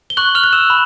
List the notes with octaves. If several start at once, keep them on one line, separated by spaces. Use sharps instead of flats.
G7
C#6 F#6 F#7
F6 F7
F#6
E6 E7
B5